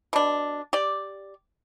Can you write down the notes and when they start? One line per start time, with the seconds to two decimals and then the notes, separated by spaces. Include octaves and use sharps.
0.13 B2 D4
0.73 G4 D5